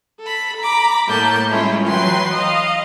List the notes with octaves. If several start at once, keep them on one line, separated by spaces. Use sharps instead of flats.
A4 B5
A#5 B5 D6
A2 A3 A#3 A5 G6
G3 G#3 C#4 E4 F4
E3 F#3 B4 G5 C6
D#5 F5